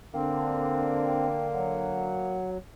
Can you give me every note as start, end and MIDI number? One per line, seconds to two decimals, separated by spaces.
0.14 2.27 50
0.14 2.38 58
0.14 1.27 60
0.14 1.47 79
1.54 2.57 54
1.54 2.50 78